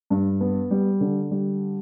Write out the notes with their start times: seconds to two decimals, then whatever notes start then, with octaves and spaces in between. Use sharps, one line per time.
0.10 G2
0.41 B3
0.71 G3
1.01 D3
1.31 G3